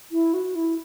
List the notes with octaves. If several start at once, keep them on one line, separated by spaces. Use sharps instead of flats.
E4
F#4
E4